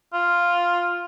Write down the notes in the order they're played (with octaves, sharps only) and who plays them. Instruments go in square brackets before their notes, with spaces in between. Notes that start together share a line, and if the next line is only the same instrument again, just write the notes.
[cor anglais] F4